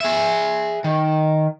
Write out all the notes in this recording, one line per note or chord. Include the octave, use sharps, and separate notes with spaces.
G#4 E5
D#3